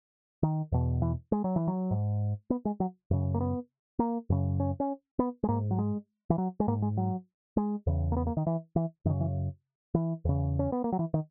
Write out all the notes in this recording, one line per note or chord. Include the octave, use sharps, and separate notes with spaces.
D#3
E2 B2
E3
G#3
F#3
E3
F#3
G#2
B3
G#3
F#3
F#2 C#3
A#3
B3
A#3
F#2 C#3
C#4
C#4
B3
G#3
G#2 A#3
F#3
G#3
E3
F#3
G#3
G#2 A#3
G#3
F#3
G#3
E2 C#3
A#3
B3
A#3
D#3
E3
E3
F#2 C#3 D#3
E3
E3
E2 C#3
C#4
B3
A#3
F#3
E3
D#3